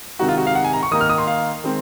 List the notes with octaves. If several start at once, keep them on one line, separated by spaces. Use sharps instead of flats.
C3 D#3 G#3 D#4 F#4
F4
F#4
F5
F#5
G#5
A#5
C#6
D#3 A#3 D#4 D#6
F6
D#6
C6
F5
D#3 G#3 C4